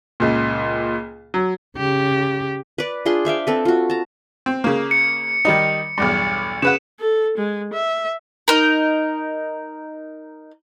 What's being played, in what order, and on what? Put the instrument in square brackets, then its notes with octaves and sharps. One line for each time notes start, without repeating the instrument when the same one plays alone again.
[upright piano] C#2 A#2
F#3
[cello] C#3 G4
[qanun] B4 D5
D4 F4 G#4 C6
C5 E5 F5 G5
C4 A4 B4
F4 F#4
A5 A#5
[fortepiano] C4
C#3 A#3
[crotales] C#7
[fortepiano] D#3 G3 D#4
B1 E2 G2
[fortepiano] C#3 B4 F#5 [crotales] E7
[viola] A4
G#3
E5
[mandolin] D#4 A#4